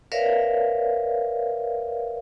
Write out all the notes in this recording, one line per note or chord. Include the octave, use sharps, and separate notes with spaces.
A#4 B4 C#5 D5 E5 F5